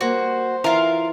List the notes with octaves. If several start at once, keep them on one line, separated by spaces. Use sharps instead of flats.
G3 A#3 F#4 C5
E3 F4 A#4 E5